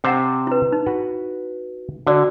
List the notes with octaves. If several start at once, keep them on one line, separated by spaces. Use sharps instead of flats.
C3 C5 F#5 G5 A5
E4 B4
D#4
F#4 B4
D3 F#4 D5